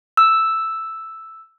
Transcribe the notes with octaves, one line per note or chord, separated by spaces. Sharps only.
E6